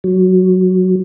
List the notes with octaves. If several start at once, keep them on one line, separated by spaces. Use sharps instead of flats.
F#3